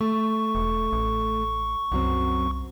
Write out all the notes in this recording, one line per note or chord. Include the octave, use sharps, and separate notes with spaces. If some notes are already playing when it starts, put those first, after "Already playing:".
A3 C#6
E1
A1
C2 F#2 F#3 C4